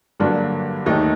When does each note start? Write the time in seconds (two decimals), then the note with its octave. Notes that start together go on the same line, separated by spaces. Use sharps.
0.20 G2 D3 F#3 A#3 D4
0.86 D#2 D#3 A3 D#4